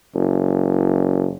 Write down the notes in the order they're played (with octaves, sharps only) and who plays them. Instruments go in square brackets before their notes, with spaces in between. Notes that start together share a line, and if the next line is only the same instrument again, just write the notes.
[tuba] F#1